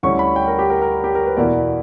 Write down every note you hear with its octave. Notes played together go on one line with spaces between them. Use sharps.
D2 D3 G3 C#4 E4 C#6
B5
G5
A#4
G4
A#4
A#4
G4
A#4
B4
E2 B2 A#3 E4 D5